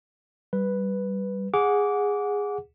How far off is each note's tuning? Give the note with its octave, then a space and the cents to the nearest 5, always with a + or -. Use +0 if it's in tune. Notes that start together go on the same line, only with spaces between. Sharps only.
G3 -15 B4 +0
G#4 -10 F#5 -20 D6 -20